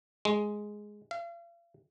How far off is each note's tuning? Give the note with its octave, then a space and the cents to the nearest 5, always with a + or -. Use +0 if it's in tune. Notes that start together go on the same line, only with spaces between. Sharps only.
G#3 +5
F5 -40